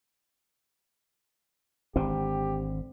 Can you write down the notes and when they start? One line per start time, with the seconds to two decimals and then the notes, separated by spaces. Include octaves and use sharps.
1.96 G#1 D3 C4 G4